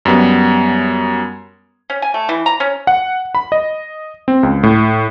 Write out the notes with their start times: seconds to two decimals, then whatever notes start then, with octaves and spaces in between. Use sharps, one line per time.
0.05 F#2 G3 B3
1.90 C#4
2.02 G#5
2.14 A3
2.29 E3
2.46 A#5
2.60 C#4
2.87 F#5
3.35 B5
3.52 D#5
4.28 C4
4.43 C#2
4.63 A2